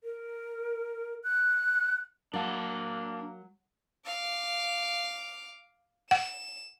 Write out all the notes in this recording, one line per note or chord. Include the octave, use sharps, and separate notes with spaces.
A#4
F#6
F#3 A#3 D4 F5 A5
F5 D6
F#5 E7